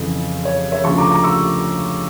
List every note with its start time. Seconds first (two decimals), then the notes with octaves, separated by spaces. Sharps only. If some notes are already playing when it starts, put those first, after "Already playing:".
Already playing: F2 C#3 E3
0.45 C#5
0.71 C#5 E5
0.84 D2 C#3 F3 A5 C#6
0.97 A#5 D6
1.11 A#5 D6
1.24 C#6 E6